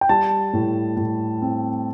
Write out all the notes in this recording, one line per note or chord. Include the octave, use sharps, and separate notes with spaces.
G5
G3 A5
A2
A2
C4